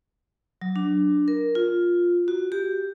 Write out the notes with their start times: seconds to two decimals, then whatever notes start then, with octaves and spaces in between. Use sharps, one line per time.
0.62 F#3
0.76 D4
1.28 A#4
1.55 F4
2.28 F#4
2.52 G4